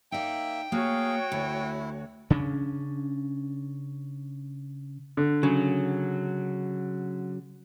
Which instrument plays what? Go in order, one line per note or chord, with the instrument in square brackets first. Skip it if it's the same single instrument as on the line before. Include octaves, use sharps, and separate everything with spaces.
[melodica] A#3 E5 [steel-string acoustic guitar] D#4 D5 [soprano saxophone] G5
[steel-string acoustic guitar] A#3 [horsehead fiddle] F#4 C#5 [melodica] G#4 F5
[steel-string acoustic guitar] D2 [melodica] E4
[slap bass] C#3 C#4 D4
[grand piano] D3
[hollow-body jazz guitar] C#3 [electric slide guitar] F#3